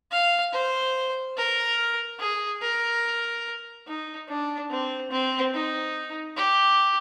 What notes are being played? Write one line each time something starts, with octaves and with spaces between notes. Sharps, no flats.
F5
C5
A#4
G#4
A#4
D#4
D4
C4
C4
D#4
G4